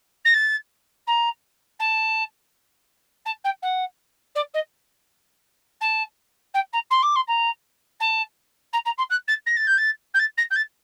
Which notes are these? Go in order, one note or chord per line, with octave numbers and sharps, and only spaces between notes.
A#6
A6
A#5
A5
A5
G5
F#5
D5
D#5
A5
G5
A#5
C6
D6
C6
A#5
A5
A#5
A#5
C6
F#6
A6
A#6
A6
G6
A6
G6
A6
A#6
G6
A6